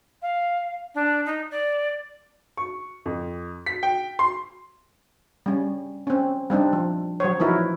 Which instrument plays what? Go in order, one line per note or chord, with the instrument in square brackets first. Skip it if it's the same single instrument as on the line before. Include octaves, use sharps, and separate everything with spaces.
[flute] F5
D4
D#4
D5
[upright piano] C#6
F2
B6
G5
C6
[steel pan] G3 C#4
C4 C#4
G3 C4 D4 D#4
F3
F#3 C5 C#5
E3 F3 D#4 E4 F#4 A#4